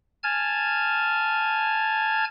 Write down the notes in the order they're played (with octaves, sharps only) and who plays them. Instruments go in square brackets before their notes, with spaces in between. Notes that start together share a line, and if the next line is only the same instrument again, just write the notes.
[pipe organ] G#5 A5 F6 G#6